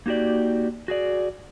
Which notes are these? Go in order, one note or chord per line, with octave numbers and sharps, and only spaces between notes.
A#3 D#4 F#4 G4 D5
F#4 G#4 D5